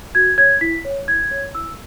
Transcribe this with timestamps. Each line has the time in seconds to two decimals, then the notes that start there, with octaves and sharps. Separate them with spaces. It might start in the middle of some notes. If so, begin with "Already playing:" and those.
0.15 F#4 G#6
0.38 C#5 G#6
0.61 E4 B6
0.85 C#5
1.08 E4 G#6
1.31 C#5
1.55 E4 E6